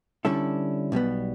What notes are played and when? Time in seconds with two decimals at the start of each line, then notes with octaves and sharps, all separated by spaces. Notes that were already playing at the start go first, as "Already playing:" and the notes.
0.25 D3 G3 C#4 E4 A4
0.92 B1 B2 G3 B3